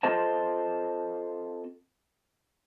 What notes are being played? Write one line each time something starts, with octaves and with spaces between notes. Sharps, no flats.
C4 F4 A4 C5 D#5 A5